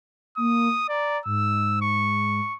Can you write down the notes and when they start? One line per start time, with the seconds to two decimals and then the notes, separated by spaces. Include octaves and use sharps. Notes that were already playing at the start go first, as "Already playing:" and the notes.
0.37 A#3 D#6
0.89 D5 A#5
1.26 G#2 E6
1.82 C#6